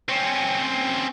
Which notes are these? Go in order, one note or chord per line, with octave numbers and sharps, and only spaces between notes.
C4 C#4